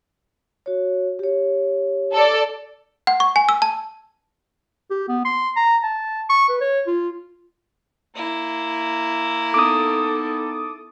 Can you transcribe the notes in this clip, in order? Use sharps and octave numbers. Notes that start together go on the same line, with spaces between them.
F#4 C#5
G4 C#5
A4 D5
F#5
C#6
G#5
E6
A5
G4
B3
C6
A#5
A5
C#6
B4
C#5
F4
A#3 E4
B3 D#4 A4 D6 D#6